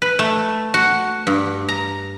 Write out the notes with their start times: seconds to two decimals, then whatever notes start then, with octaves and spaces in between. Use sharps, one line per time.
0.02 B4
0.19 A3
0.74 F#4
1.27 G2
1.69 A#5